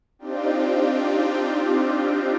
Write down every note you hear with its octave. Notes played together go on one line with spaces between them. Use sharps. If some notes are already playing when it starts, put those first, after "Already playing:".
C4 D4 D#4 F4 G4